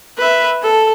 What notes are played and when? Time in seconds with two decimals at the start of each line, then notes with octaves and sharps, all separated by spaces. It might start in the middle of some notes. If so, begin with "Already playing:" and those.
0.18 B4 E5
0.63 A4